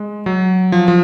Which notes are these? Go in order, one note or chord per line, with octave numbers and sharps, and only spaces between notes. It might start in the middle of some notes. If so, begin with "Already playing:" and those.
Already playing: G#3
F#3
F3
F3